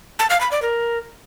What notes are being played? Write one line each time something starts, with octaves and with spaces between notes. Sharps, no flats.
A5
F5
B5
D5
A#4